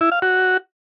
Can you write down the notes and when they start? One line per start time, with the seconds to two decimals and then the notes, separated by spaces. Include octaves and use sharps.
0.01 E4
0.12 F5
0.22 F#4